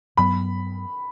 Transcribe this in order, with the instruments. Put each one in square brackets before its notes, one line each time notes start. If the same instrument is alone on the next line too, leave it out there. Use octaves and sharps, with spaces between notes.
[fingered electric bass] G2 F#3 B3 [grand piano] B5